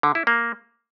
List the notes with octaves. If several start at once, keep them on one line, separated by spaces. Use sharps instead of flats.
D3
E4
A#3